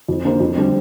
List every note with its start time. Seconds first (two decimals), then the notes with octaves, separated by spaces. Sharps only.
0.08 F2
0.25 D3 A#3 G4 C5
0.40 F2
0.57 D3 G3 C4 G4